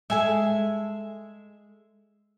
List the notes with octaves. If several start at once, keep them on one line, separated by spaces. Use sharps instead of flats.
G#3 A4 E5 G#5